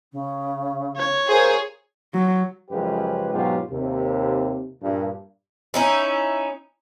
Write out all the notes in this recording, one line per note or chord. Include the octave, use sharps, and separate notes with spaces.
C#3
C#5
F4 G#4 A#4 C5
F#3
F#2 C#3 F3 G#3 G4 B4
G#2 B2 F#3 F4 G4
D#2 C3
G2 A#2
C#4 D#4 E4